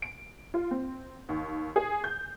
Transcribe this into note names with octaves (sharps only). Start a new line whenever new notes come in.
D7
F4
C4
D#2
G#4
G6